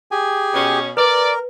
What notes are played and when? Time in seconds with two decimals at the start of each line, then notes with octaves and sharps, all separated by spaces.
0.11 G4 G#4 G#5
0.54 B2 C#4
0.97 A#4 B4 D5